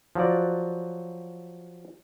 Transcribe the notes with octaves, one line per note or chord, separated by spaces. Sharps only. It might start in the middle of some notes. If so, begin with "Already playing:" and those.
F3 F#3 F#4 D5